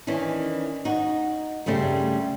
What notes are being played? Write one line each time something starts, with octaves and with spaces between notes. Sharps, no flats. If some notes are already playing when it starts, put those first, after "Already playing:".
D#3 E3 C#4 D4
D#4 F#4
G2 C#3 G3 A3 C4